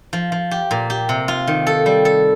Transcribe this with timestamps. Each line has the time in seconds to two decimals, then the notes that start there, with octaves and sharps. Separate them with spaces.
0.13 F3
0.32 F3
0.51 G4
0.71 A#2
0.90 G4
1.09 C3
1.28 F4
1.47 D#3
1.67 A4
1.86 G3
2.05 A4